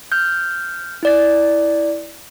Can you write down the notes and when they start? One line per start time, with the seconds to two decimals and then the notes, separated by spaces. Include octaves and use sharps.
0.12 F6 G6
1.03 E4 D5 A6